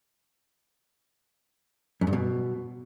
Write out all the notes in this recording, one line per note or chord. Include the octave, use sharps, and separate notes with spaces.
F#2
G2
B2